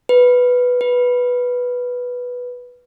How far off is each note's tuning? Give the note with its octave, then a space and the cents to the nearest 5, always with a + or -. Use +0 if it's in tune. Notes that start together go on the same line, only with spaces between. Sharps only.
B4 +0
B4 -5